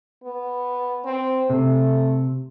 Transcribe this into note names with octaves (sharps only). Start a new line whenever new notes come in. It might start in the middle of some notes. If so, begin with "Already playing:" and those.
B3
C4
C3 A3